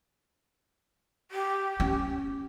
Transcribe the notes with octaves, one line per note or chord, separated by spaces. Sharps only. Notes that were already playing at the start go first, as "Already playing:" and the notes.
G4
C#4